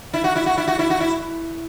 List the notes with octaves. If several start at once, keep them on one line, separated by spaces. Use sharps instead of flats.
E4
F#4
E4
F#4
E4
F#4
E4
F#4
E4